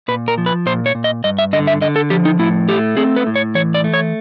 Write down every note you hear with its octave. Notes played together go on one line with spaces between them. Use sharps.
A#2 B4
A#4
F3
B4
A#2 C5
C#5
A#2
D#5
G2 D#5
E5
D3 D#5
E5
D3 D#5
A4
F3 G4
D#4
A2 E4
A3 G4
C4 G#4
B4
A2
C#5
E3 C#5
D5
A3
C#5